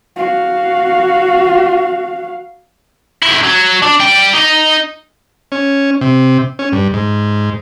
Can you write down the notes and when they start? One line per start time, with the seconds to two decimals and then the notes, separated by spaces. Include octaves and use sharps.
0.16 F#4 F5
3.22 F#2 E4
3.44 F#3
3.82 D4
4.00 G3 G5
4.34 D#4
5.52 C#4
6.01 C3
6.59 C#4
6.72 G2
6.94 G#2